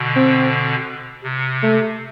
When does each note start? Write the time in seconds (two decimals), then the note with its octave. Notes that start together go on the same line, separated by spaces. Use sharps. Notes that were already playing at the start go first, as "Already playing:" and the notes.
Already playing: B2 D3
0.16 C4
1.23 C3
1.63 A3